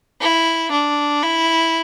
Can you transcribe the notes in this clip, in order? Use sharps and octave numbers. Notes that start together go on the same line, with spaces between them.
E4
D4
E4